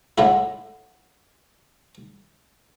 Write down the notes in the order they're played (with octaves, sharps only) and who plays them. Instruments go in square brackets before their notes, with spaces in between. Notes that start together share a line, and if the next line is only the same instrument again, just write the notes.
[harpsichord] A2 G#3 E4 [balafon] F#5